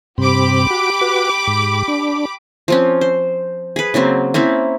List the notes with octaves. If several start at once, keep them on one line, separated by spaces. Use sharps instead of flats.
G2 C3 C4 G4 B5 D6
F#4
F#4 B4
G#2
D4
F3 C4 C#4
C5
G#4 B4
C#3 F#3 A#3 C4
A#3 C4 C#4 E4